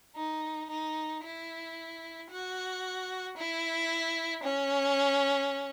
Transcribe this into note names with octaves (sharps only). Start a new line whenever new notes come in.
D#4
D#4
E4
F#4
E4
C#4